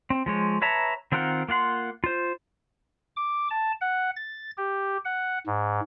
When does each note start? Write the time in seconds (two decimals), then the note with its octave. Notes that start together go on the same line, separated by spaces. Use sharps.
0.10 C4
0.26 F3 G#3 C#5
0.62 B4 C#5 E5 A5 A#5
1.12 D#3 C4 F4 A#4 F#5
1.49 A#3 F4 F#5 C6
2.04 F4 C5
3.16 D6
3.51 A5
3.81 F#5
4.16 A6
4.57 G4
5.05 F#5
5.47 G#2